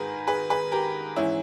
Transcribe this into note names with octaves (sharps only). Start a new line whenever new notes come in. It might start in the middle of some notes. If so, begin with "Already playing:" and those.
Already playing: G#2 D#3 G#4 A#4 B4
G#4 B4
G#4 B4
G4 A#4
G#2 E3 C#4 E4